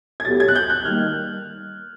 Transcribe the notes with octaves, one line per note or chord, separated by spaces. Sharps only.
G#6
A2 F#3 B3 E4 G4 A6
G#6
F#6
G6
F#6
D#3 G3 A#3 F6